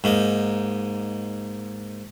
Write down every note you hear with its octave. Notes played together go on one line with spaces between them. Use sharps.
G#2 A#3 D#4